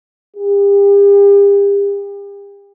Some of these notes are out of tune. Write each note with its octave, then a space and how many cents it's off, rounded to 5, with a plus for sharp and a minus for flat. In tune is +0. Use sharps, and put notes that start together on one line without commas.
G4 +40